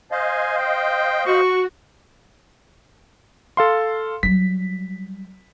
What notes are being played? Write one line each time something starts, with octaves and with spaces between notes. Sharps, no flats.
C5 D#5 F5 G#5
G5
F#4 C#6
A4 F5 C6
F#3 G3 B6